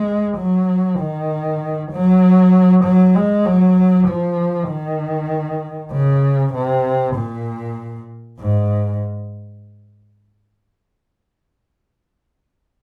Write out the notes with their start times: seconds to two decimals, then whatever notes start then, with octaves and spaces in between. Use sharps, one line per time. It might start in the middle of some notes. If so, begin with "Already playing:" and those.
Already playing: G#3
0.37 F#3
0.99 D#3
1.91 F#3
2.84 F#3
3.15 G#3
3.46 F#3
4.08 F3
4.69 D#3
5.93 C#3
6.54 C3
7.16 A#2
8.39 G#2